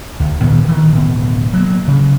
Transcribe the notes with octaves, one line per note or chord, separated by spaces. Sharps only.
D2
A#2 D#3 E3 B3
D#3 E3
D1 B2
F#3 A#3
C#3